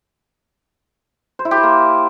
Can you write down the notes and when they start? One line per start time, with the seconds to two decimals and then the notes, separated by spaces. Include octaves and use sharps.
1.39 C5
1.45 E4
1.51 G4
1.57 C5
1.63 A#3